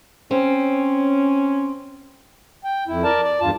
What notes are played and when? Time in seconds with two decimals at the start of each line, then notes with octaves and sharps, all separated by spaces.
0.31 C4 C#4
2.64 G5
2.87 F2 E4
3.04 A#4 D5 A5
3.24 D5
3.40 E2 G2 F4 A5